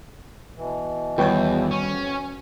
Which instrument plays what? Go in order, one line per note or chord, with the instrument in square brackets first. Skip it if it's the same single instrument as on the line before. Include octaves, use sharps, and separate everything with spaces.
[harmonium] B2 E3
[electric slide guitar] E2 [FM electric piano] D#3 G3 C#5 [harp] F#4 B4 G5
[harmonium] F2 [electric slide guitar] C#4